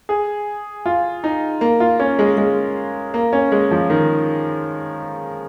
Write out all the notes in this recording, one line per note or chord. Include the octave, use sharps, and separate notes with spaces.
G#4
F4
D#4
A#3
F4
C#4
G#3
G#3
A#3
C#4
G#3
F3
D#3